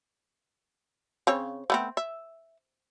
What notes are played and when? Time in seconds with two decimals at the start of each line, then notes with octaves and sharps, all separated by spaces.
1.27 C#3 C4 C#5
1.70 A3 B3 C4
1.97 E5